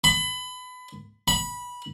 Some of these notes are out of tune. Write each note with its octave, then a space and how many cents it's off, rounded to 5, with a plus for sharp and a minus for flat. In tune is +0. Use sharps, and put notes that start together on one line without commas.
B5 +25
B5 -15